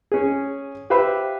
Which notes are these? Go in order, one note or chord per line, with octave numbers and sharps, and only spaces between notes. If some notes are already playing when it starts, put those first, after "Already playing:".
C#4 G#4
G4 B4 C5 E5 F5 B5